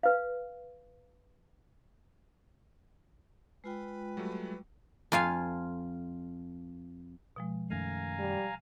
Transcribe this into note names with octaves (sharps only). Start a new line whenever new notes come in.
B4 F5
G#3 F4 B4 G5
F#3 G3 A3
F2 F4 F5 G#5
B2 F3 G#3
F#2 D#3 A3 F5 G#5 A#5
G3